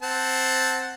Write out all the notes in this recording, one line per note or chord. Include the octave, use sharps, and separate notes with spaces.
C4 F#5 A5